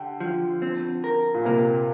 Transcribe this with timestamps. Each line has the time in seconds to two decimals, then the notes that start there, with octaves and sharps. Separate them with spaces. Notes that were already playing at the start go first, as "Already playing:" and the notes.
Already playing: D3 G4
0.20 F3
0.62 C4
1.04 A#4
1.34 A#2
1.45 C3 A#3